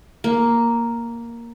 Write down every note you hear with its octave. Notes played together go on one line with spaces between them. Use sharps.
A#3